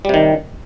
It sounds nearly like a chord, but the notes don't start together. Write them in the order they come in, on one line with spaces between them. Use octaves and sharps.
G3 C3 D#3